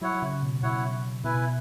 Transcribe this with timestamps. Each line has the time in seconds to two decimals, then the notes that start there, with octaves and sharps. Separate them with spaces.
0.01 F#3 E4 C#5 F#5
0.22 C#3
0.42 B2
0.63 B2 E4 C#5 F#5
1.24 B2 E4 B4 G#5